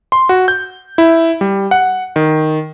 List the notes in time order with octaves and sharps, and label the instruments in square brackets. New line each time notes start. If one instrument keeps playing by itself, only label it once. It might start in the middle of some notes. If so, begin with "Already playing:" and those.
[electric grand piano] C6
F#4
G6
E4
G3
F#5
D#3